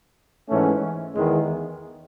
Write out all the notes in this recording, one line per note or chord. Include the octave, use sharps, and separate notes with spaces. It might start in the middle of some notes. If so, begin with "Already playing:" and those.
G#2 E3 A3 C#4
E2 D#3 G#3